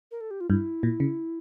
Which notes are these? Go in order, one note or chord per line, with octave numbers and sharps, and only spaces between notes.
A#4
A4
G4
F4
G2 E4
A#2
C#3